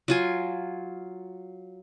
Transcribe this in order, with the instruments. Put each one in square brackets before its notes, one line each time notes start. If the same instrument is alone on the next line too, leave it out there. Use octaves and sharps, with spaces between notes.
[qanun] F#3 F4 G#5